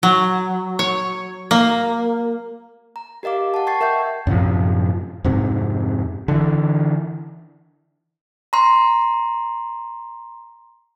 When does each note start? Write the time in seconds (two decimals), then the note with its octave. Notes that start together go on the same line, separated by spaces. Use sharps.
0.03 F#3
0.79 C#5
1.51 A#3
2.96 A#5
3.23 G4 A#4 D#5 F5 D6
3.54 F#5 A5
3.67 G5 A5 C#6 G#6 A6 C7
3.81 A#4 E5 F#5 C#6 G6
4.27 F#2 A2 C3 F3
5.24 F2 G#2 C3
6.28 D3 E3
8.53 A#5 C6